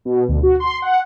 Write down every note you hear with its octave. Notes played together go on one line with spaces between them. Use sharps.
B2
D2
F#4
C6
F#5